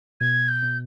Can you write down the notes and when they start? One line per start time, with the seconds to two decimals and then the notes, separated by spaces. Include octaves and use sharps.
0.20 B2 G#6
0.48 G6
0.62 B2